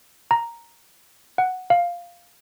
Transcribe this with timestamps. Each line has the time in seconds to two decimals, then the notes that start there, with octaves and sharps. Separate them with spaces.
0.31 A#5
1.38 F#5
1.70 F5